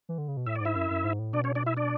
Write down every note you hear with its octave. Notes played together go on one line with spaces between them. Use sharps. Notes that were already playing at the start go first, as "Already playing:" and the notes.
E3
D3
C#3
B2
A2 E5
D5
G#2 E4 E5
F#2
F#2
G#2
A2
B2 D4 D5
C#4 C#5
D4 D5
E4 E5
D4 D5